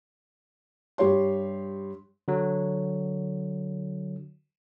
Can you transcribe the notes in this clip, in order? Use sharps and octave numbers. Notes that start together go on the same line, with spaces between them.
G2 G4 C#5 C6
D3 F#3